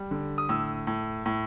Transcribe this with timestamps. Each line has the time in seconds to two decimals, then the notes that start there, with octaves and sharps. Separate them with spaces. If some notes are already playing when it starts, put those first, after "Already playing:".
Already playing: G3
0.11 D3
0.38 D#6
0.49 A2 E6
0.87 A2
1.26 A2